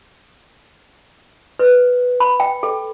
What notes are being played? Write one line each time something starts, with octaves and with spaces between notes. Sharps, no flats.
B4
B5
G5
A4